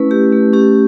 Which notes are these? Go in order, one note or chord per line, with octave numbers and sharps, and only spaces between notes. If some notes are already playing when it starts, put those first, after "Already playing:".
Already playing: A3 C#4 E4 B4
A3 G4
A3
C#4 G4